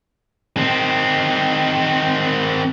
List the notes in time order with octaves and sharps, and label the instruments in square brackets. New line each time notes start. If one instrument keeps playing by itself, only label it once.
[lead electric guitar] D#3 C4